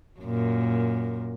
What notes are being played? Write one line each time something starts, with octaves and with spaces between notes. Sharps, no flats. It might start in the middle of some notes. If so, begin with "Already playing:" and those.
F#2 A#2